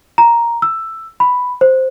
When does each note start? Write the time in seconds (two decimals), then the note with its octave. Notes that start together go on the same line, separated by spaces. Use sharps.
0.18 A#5
0.62 E6
1.20 B5
1.61 C5